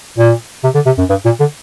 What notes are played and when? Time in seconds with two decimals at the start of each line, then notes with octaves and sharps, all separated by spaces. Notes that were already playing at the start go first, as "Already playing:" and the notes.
0.18 A#2
0.64 C3
0.75 D3
0.86 C3
0.98 F#2
1.10 G2
1.25 A#2
1.40 D3